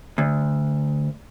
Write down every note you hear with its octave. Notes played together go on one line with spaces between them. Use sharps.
D2